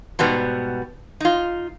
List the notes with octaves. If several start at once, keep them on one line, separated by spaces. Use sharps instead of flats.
G#2 B2 G3 B3
D#4 F4